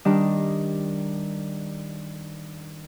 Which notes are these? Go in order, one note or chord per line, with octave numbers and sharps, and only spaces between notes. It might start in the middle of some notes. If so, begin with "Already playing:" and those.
D#3 G3 D4